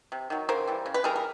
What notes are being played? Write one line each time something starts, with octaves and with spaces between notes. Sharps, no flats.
C3
D#3 F#3
C#3 A#4 C5
E3 G3
C#3
B4
E3 G3 G#4 A#4
A#4